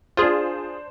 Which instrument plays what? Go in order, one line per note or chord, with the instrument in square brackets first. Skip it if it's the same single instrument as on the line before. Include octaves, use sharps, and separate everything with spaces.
[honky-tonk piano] D4 C5 [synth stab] F4 G#4